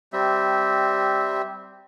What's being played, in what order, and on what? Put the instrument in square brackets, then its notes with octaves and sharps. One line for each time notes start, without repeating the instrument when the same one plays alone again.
[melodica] G3 C4 E5